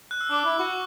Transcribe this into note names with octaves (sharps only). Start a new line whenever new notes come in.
F#6
E6
D4 D6
E4
F#4 C#6